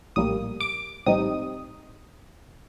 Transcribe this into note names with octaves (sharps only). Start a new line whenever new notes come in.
A#1 A2 G3 A#3 D#6
D6
A#1 A2 G3 C4 D#4 D#6